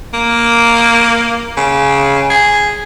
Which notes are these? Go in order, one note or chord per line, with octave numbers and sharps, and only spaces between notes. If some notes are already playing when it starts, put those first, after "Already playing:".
A#3
C#3
G#4